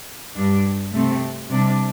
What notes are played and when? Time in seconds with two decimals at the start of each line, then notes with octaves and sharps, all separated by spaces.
0.36 G2 G3 D4
0.92 C3 A3 C4
1.49 C3 G3 D4